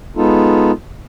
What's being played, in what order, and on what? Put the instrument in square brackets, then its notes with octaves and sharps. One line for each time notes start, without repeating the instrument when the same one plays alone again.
[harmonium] G#3 B3 D#4 F4 A4